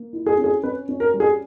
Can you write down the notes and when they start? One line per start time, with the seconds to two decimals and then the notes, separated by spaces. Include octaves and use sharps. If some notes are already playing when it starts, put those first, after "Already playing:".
Already playing: A#3
0.13 E4
0.26 G#4
0.38 C#4
0.44 G#4
0.63 C#4 B4
0.89 C#4
1.00 A#4
1.14 G3
1.20 G#4